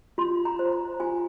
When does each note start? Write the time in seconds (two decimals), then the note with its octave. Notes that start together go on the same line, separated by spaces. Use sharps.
0.18 F4 C6
0.45 A#5
0.59 C5
0.72 A#5
1.00 F4 G#5